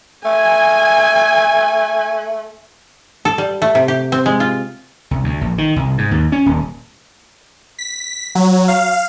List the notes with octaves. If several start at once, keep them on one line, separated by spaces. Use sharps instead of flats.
A3 G#5
A4
G3
A3
C3
G4
C4
G#3
F4
C2
D2
A#1
D#3
C2
G#2
D#2
C#4
D#1
B6
F#3
F5